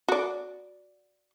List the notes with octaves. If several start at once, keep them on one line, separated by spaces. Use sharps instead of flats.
F#4 D5